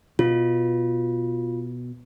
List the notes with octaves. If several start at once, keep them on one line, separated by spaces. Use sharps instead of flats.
B2 F4